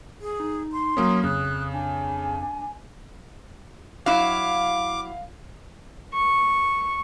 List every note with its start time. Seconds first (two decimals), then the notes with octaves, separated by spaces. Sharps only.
0.22 G#4
0.40 D#4
0.72 C6
0.97 F#3 A#3 C#4 D#6
1.24 F2 C#3 D#6 F#6
1.73 D4 G#5
4.06 F#3 E4 F5 D6
6.14 C#6